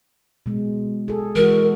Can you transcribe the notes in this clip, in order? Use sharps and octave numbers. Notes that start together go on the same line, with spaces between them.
B2 G#3
G#4 A4
E3 G#3 F#4 A#4